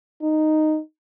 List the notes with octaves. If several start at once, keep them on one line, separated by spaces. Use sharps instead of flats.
D#4